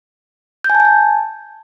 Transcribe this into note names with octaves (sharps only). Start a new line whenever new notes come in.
G6
G#5
A5
G#5
A5